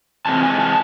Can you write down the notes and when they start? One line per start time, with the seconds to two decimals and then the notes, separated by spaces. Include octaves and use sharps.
0.26 C3 E3 G#3 C4 A5
0.43 G#5
0.60 A5